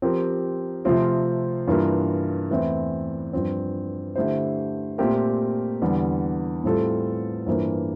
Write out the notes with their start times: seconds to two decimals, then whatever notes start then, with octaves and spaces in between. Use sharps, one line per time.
0.02 F3 C4 G4 A#4
0.85 C3 F3 A3 C4 F4
1.67 G2 E3 A#3 F4 A#4
2.51 E2 E3 A3 C4 E4
3.33 G2 F3 C4
4.16 D3 A3 E4 G4 C5
4.98 A#2 A3 C4 G4 A#4
5.82 E2 D3 G3
6.64 A2 G3 C4 F4 A4
7.46 G2 E3 A#3 F4 C5